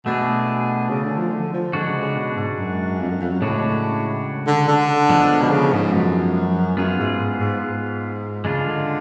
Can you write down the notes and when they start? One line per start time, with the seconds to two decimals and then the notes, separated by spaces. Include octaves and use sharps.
0.06 B2 A3 D4 G#4
0.90 C#3
1.04 D3
1.17 F3
1.33 D3
1.53 F3
1.73 D3 G#3 D4 F#4
1.88 C#3
2.01 C#3
2.16 B2
2.36 G#2
2.58 F#2
3.00 F2
3.10 F#2
3.20 F2
3.32 F#2
3.41 A2 C#3 G#3 D4 F#4
4.47 D3
4.68 D3
5.10 F3 G#3 B3 D4
5.42 B2
5.51 C#3
5.73 G#2
5.93 F#2
6.77 F#2 B3 F4 G#4
6.99 G#2
7.19 G#2
7.39 G#2
7.61 G#2
8.45 C#3 G#3 D4 F4
8.66 D3